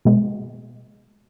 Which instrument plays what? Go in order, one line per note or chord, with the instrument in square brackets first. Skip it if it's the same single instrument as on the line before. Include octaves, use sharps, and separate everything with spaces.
[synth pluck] B2 G#3 B3